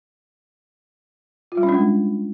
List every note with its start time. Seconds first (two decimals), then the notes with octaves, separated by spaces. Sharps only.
1.52 F4
1.57 G3
1.63 C#4
1.69 D4
1.74 G#3